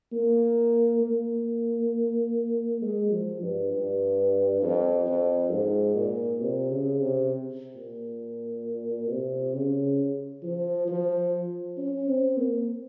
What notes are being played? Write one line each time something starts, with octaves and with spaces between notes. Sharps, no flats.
A#3
A#3
G#3
F3
G2
G2
F2
F2
G#2
A#2
C3
C#3
C3
A#2
C3
C#3
F3
F3
C#4
C4
A#3